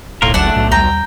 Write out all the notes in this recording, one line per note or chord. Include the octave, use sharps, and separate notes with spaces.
D1 B1 A2 A#3 F4 A#4
F#1 C#2 F#3 A3 D4 F#5 A5
B1 A2
D#2 G3 G5 A#5